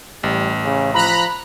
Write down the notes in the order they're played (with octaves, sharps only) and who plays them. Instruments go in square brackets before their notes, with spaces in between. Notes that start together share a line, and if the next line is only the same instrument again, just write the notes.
[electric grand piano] A1 [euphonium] G3
[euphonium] C#3
[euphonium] F3 [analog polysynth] A#5 B5 F#6